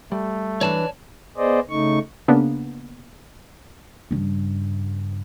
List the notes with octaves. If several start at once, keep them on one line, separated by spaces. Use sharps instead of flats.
G3 A3
E3 D4 C#5 D5 A5
B3 G#4 C5 D5 D#5
C#3 A3 D#4 C#6
C#3 A#3 B3 D4
G2 C#3